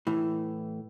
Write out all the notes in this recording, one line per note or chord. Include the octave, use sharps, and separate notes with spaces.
A2 E3